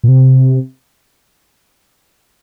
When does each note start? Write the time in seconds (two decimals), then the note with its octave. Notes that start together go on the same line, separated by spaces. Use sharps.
0.04 A#2
0.08 C3